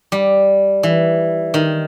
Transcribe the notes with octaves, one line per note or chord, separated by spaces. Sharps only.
G3
E3
D#3